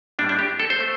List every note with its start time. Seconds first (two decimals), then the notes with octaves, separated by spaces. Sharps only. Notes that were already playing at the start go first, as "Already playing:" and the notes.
0.19 A2 G3 D4
0.29 D4
0.39 G4
0.60 A4
0.70 C5
0.80 A3